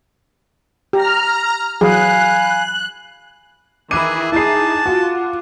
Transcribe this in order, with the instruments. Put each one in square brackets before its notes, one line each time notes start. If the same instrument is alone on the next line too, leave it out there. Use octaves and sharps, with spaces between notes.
[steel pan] G4 [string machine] A#5 F6
[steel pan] E3 F#3 G#4 [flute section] F5 G#5 B5 [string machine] F#6
[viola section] D#3 E3 E4 [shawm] G#4 [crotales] D6 F#6 [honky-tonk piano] D#7
[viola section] D#4 G#4 [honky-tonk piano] E4 C7 [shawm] A5
[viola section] F4 [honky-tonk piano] F#4